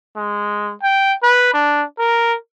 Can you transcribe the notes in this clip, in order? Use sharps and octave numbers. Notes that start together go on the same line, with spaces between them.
G#3
G5
B4
D4
A#4